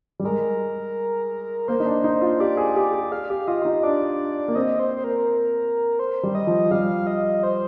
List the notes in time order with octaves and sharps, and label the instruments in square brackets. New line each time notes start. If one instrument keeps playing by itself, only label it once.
[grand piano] G3
[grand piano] G#3 [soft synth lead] A#4
[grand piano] A#3 [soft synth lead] C5
[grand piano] D#4
D4
D#4
F4
[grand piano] G4 [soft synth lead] D5
[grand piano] G#4
G4
G4
[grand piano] G#4 [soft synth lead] F5
[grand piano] G4
[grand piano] F4 [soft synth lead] D#5
[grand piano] F4
D#4
[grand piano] D4 [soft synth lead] D5
[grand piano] A#3
[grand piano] C4 [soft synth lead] D#5
[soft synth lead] C5
C5
A#4
C5
[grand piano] G3
[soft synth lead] D#5
[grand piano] F3
[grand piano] G3 [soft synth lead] F5
[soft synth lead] D#5
C5